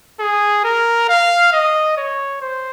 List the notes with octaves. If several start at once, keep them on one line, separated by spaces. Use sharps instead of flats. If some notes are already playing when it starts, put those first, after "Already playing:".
G#4
A#4
F5
D#5
C#5
C5